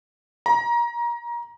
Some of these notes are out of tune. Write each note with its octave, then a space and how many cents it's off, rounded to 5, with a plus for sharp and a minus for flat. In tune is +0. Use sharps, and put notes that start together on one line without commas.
A#5 +25